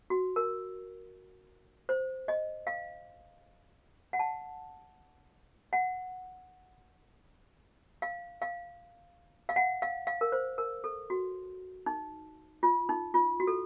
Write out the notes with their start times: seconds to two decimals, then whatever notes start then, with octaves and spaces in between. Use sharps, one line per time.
0.10 F#4
0.36 A#4
1.89 C5
2.28 D#5
2.67 F5
4.13 F#5
4.19 A5
5.73 F#5
8.02 F5
8.42 F5
9.49 F5
9.56 F#5
9.82 F5
10.07 F5
10.21 A#4
10.32 C5
10.58 A#4
10.84 A4
11.10 F#4
11.86 D#4
12.63 F4
12.89 D#4
13.14 F4
13.40 F#4
13.47 A4